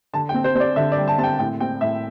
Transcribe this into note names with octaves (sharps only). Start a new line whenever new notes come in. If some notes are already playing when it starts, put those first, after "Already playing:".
D3 A5
G5
C4
C5
C4 C5 D5
D3 E5
D5
G3
A5
C4 A5
G5
A2 G5
C4 G5
A2 E5